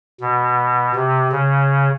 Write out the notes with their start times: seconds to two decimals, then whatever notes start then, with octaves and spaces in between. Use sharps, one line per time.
0.21 B2
0.96 C3
1.32 C#3